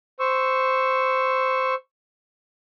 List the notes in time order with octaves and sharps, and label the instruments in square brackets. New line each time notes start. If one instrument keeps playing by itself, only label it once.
[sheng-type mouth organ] C5 C#6 E6